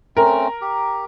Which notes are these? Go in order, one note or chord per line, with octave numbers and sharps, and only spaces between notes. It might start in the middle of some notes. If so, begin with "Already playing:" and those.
A3 C4 C#4 A#4
G4